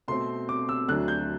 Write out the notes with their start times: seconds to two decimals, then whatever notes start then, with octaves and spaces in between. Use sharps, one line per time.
0.08 B2 A3 C4 C6
0.49 D6
0.69 E6
0.88 D2 D3 F#3 A3 D4 F#6
1.08 G6